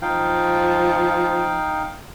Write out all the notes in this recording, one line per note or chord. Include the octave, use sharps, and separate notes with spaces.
F3 D#4 F5 G5